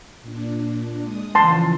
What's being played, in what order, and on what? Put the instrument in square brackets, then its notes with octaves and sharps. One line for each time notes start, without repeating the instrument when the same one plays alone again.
[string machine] A#2 D4
G#3 D#6
[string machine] C#3 E3 F3 [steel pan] A5 C6